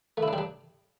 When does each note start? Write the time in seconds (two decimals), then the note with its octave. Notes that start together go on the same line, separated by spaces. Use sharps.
0.17 A3
0.23 E4
0.28 D4
0.33 G3
0.38 D4